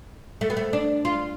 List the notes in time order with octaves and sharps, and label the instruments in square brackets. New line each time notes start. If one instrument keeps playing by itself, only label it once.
[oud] A3
B3
A3
D4
F4